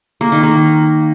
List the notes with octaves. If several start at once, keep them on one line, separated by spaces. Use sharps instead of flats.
A#3
D#3
A#3